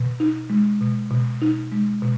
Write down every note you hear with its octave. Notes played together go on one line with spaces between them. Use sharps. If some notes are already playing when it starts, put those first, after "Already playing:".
Already playing: B2
D#4
G#3
B2
B2
D#4
G#3
B2